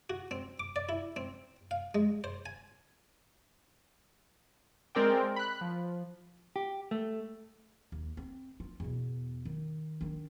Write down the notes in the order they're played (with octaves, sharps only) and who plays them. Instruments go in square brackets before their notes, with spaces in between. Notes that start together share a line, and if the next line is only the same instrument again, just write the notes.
[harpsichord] F#4
C4
D6
D5
E4
C4
F5
G#3
C5
G#5
[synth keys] G#3 C4 A#4 D5 G5
B5 F#6
F3
[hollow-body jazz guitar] G4
A3
[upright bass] D#2
C4
F4
E2 B2
D#3
D#3 D4